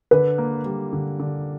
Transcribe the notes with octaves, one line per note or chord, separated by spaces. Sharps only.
D3 B4
A#3
G3
D3
D3